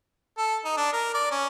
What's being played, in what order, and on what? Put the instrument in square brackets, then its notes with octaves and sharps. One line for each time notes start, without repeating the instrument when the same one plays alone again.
[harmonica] A4
D#4
D4
A#4
D5
C#4